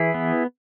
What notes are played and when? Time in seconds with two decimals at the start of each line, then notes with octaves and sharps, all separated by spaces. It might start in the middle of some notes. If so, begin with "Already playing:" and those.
Already playing: E3 E4 G#4
0.14 B3